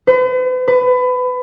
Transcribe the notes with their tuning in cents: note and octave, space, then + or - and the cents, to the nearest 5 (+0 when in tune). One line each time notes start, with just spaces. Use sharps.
B4 +45
B4 +25